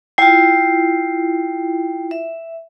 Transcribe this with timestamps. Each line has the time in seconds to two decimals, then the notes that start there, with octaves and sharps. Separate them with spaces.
0.18 E4 F4 G5 C7
2.11 E5